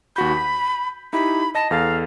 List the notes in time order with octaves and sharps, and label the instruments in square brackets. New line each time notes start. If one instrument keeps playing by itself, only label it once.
[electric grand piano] D#2 F#4 G6 [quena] B5
[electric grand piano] B6
[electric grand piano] D#4 E4 G4 [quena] B5
[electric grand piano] D#5 A#6 [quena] A5
[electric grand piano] E2 A4 A6 [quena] F5